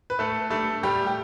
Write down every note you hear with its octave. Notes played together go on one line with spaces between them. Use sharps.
B4
A2 A3 A4
G3 A3 D4 A4
A2 G3 G4
G4